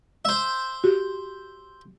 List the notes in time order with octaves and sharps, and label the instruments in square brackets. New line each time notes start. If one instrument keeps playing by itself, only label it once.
[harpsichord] C5 E5
[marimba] F#4 G4